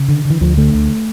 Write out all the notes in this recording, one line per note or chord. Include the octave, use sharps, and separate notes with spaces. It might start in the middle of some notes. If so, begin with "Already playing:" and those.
Already playing: C#3
D3
D3 E3
D2 F3
D3 A3
D2